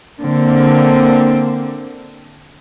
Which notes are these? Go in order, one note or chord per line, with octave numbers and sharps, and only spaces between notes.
D3 A#3 C4